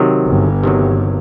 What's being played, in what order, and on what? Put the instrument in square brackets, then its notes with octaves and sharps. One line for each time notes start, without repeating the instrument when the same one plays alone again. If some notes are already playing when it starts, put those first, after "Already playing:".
Already playing: [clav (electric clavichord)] C3 D#3 F#3
[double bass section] G1 G2
[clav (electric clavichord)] C3 D#3 F#3